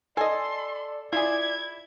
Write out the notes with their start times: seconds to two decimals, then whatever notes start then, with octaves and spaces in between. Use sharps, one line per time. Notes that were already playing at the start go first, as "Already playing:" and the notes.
0.17 A4 D5 D#5 G#5 C6
1.13 E4 F4 G#4 D5 G#6